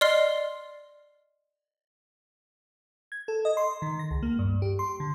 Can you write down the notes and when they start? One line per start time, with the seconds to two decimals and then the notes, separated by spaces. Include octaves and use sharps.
0.01 D5 D#5 C6 F6 C7 G7
3.12 G#6
3.28 A4
3.45 D#5
3.57 C6
3.82 D#3
3.99 A#6
4.11 C#2
4.23 A#3
4.39 G2
4.62 G4
4.79 C6
5.00 D3